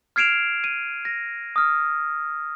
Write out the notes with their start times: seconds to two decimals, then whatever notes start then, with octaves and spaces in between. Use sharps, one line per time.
0.16 F6 G#6 C7 D7 E7 F7
0.64 D#7
1.05 A#6
1.56 D#6 F6